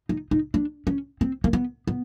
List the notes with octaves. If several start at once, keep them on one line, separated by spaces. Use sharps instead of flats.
D#4
D#4
D4
C#4
C4
A#3
B3
B3